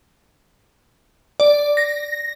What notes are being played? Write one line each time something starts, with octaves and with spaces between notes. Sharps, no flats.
D5
A#6